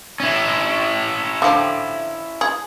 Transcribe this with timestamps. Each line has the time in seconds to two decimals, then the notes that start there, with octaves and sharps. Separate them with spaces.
0.20 C#4 E4
1.42 D3 F3 G4
2.41 G#4